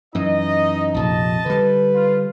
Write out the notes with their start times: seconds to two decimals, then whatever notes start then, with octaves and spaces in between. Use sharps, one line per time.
0.15 F#2 E3 D#4 D#5
0.94 A#1 F2 C3 D#5 A5
1.46 D3 G3 B4
1.94 F4